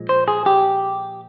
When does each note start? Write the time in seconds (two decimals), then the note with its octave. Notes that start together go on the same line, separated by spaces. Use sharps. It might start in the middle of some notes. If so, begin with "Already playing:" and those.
Already playing: A#2 F3 G#3
0.09 C5
0.28 G#4
0.46 G4